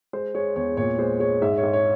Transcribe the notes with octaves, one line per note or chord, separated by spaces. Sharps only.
G#3 C5
G#3 C#5
E2 C#5
A#2 C#5
G#3 C5
G#3 C#5
G#2 E5
C#5
G#2
C#5